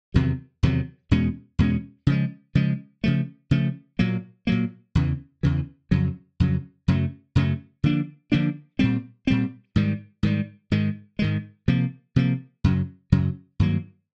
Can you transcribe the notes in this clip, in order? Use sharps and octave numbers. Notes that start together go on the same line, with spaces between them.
E2 C3 D#3 F#3
E2 C3 D#3 F#3
E2 B2 G#3 C#4
E2 B2 G#3 C#4
C#3 F3 G#3
C#3 F3 G#3
C#3 F3 A3
C#3 F3 A3
A#2 F#3 A#3
A#2 F#3 A#3
E2 C#3 E3
E2 C#3 E3
F2 C#3 F#3
F2 C#3 F#3
F#2 C#3 F#3 A3
F#2 C#3 F#3 A3
D3 F3 A#3 D4
D3 F3 A#3 D4
A#2 G3 C4
A#2 G3 C4
G#2 D#3 G3
G#2 D#3 G3
G#2 D#3 G#3
G#2 D#3 G#3
C3 F3 A#3
C3 F3 A#3
F#2 C#3 F#3
F#2 C#3 F#3
G2 D#3 F#3 A#3